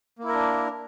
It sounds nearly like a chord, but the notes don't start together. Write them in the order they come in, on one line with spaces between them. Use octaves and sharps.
A#3 E4 A#4 D4